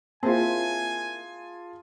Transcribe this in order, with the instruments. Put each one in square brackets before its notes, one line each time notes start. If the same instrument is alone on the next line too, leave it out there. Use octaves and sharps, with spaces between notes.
[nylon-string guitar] A#3 E4 [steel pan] C4 [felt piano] F4 G#4 A5 [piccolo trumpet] G#5